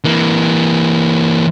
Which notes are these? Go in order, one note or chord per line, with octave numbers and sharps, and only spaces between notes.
E3 A#3